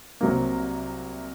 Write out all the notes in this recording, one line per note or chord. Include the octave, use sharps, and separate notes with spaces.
C2 C3 F#3 A#3